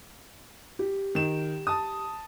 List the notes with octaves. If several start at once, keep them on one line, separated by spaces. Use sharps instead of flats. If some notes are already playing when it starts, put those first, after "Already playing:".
G4
D#3 E7
A5 D#6